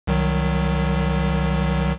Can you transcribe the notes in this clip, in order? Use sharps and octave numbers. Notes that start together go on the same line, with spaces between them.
C2 D#3 F#3